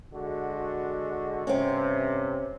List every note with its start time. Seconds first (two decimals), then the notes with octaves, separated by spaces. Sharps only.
0.14 D3 G#3 F#4
1.47 G2 C3 C4 C#4